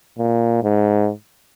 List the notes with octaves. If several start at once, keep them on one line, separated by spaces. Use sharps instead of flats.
A#2
G#2